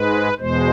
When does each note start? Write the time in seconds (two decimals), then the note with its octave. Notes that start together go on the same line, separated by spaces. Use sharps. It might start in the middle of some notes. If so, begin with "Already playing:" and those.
Already playing: G#2 G#3 B4
0.39 E2 B2 G#3 C5